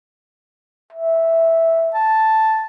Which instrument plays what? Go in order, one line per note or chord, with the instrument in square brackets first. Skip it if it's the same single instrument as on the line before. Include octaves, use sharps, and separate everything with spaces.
[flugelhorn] E5
[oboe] A5